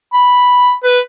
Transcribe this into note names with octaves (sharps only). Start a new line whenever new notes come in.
B5
B4